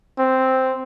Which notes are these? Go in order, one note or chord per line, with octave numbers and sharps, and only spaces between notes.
C4